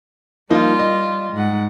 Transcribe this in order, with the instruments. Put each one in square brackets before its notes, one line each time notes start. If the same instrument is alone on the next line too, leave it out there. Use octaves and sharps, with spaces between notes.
[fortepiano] F3 A#3 D#4 [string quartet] G3 F4
[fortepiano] D#5
[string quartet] G#2 F#5